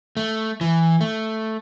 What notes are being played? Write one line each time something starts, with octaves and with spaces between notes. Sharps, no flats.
A3
E3
A3